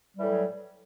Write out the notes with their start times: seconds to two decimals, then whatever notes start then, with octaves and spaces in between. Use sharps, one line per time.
0.15 G3
0.19 E3
0.22 A2
0.26 F#3